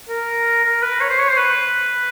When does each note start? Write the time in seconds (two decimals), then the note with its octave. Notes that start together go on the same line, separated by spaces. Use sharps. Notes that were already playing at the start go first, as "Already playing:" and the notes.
0.08 A#4
0.64 A#4
0.82 B4
1.00 C#5
1.09 C5
1.19 C#5
1.28 C5
1.37 B4